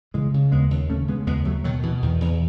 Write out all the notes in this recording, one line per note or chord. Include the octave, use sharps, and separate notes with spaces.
C#3 E3 G#3
C#3
D#2 G#3 B3
D#2
C#3 A3 C#4
C#3 G#3 B3
D#2 G#3 B3
D#2 F#3 A3
B2 D#3 F#3
B2 E3
E2 D#3
E2 E3